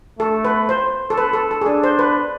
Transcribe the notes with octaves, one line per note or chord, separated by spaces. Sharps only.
A3 A4
B4
C5
A4
B4
A4
A4
G#4
D4 A4
C5
B4